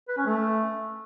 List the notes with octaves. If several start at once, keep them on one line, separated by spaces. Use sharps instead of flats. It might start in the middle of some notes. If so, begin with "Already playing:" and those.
B4
C#4
A3